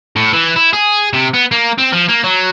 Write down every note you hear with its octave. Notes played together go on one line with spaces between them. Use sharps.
A2
E3
E4
G#4
C3
B3
A#3
C4
F3
A#3
F#3